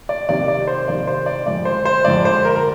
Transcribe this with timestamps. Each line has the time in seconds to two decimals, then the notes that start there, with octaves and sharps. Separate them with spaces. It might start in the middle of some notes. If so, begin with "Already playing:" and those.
0.09 D5
0.29 C3 D#3 A#3 D5
0.48 D5
0.67 C5
0.88 C3 D#3 A#3 D5
1.07 C5
1.26 D5
1.46 F2 D3 G#3 D5
1.65 C5
1.85 C5
2.05 F2 D3 G#3 D5
2.25 C5
2.45 A#4
2.55 A#4